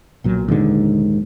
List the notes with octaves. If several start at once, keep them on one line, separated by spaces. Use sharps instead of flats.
B1 A#2 F#3
A#1 D#2 G#2 D3